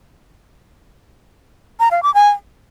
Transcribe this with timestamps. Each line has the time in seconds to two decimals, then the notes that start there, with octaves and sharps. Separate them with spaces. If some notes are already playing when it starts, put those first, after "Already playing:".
1.80 A#5
1.91 F5
2.03 D6
2.14 G#5